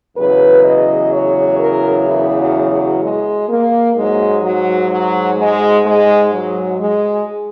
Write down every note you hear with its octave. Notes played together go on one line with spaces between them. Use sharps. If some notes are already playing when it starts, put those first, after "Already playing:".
E2 C#3 F#3 B4
D#5
C#5
A#4
E4
F#3
F#3
G#3
A#3
G#2 F#3 G#3
F#3
F#3
G#3
G#3
F#3
G#3